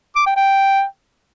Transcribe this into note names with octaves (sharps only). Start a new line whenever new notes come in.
D6
G5
G5